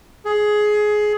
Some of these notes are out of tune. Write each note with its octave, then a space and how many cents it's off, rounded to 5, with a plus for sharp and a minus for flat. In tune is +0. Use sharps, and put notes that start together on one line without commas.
G#4 +15